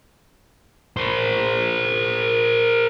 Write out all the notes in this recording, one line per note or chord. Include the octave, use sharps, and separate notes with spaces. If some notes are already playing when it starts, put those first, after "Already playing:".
A#4 C5